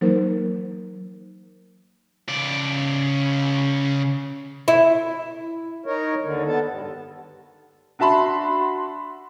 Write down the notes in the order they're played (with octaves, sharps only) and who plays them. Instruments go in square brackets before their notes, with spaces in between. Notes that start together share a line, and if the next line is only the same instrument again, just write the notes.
[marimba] E3 F#3 A#3 D#4 A#4 C5
[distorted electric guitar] C#3 D5
[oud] E4
[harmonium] D#4 A#4 C#5
D#2 D3
B3 A4
G2
[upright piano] D4 F#4 E5 A5 B5 C6